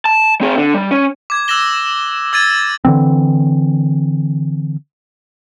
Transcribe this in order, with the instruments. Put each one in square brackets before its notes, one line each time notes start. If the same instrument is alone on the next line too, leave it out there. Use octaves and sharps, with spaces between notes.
[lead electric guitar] A5
C4 G#4
D3
G3
C#4
[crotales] D6 G#6
E6 F#6 G#6 A#6 E7 G7
E6 G#6 A6 D#7
[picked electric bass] D3 E3 C4